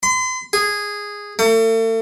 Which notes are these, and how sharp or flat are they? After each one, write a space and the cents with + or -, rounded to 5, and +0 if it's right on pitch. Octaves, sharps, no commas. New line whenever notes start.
C6 -40
G#4 -10
A3 +40